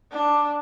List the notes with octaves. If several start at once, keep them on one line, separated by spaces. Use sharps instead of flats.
D4